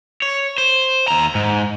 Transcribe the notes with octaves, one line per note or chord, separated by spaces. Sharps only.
C#5
C5
D#2 A#5
G#2